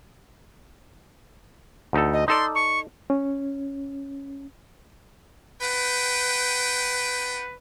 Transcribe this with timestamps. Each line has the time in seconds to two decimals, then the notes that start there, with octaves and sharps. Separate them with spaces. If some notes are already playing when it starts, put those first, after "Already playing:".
1.93 D2 D#4 A4
2.13 D#5
2.28 D#4 A4 D5 C6
2.55 C#6
3.10 C#4
5.61 D4 B4 F#5 G5